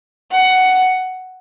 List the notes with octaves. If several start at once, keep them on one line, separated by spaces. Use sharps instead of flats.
F#5